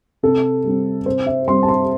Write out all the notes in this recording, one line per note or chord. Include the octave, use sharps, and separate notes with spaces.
C3 A4
G3 C4
C3 C5
E5
G3 C4 C6
A5
C6